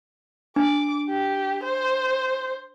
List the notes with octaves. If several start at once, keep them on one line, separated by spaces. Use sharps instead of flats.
D4 D6
G4
C5